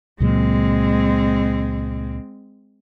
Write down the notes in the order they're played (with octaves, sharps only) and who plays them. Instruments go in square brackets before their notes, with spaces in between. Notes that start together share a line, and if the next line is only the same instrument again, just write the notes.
[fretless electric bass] C#2 A#2 F#3 [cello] G#3 C4